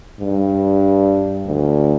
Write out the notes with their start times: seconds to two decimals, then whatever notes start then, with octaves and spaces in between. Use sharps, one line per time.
0.20 G2
1.46 D2